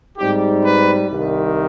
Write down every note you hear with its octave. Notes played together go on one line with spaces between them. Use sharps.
G#2 G3 C4 D#4 G4
B4
C2 C3 D#3